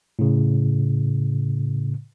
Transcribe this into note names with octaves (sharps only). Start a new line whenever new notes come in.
A2 C#3